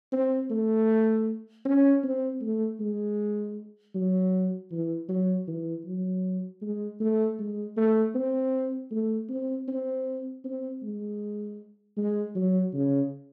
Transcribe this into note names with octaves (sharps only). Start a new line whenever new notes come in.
C4
A3
C#4
C4
A3
G#3
F#3
E3
F#3
E3
F#3
G#3
A3
G#3
A3
C4
A3
C4
C4
C4
G#3
G#3
F#3
C#3